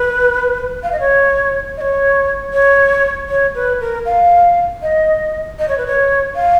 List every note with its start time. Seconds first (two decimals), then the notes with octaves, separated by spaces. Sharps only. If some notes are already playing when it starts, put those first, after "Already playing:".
Already playing: B4
0.83 F5
0.92 D#5
1.00 C#5
1.77 D#5
1.81 C#5
2.53 C#5
3.29 C#5
3.55 B4
3.81 A#4
4.06 F5
4.82 D#5
5.59 D#5
5.68 C#5
5.78 B4
5.87 C#5
6.36 F5